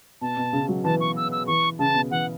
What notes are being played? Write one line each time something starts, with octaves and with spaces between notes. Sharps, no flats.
B2 A5
B2
C#3
F#3
E3 A5
C#6
E6
E6
E3 C#6
C#3 A5
B2
E3 F#5